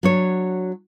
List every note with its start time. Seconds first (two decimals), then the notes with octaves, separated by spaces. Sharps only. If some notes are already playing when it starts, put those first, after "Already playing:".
0.03 F#3 D4 C#5